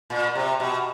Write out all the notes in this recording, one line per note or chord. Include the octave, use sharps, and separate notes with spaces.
A#2
C3
B2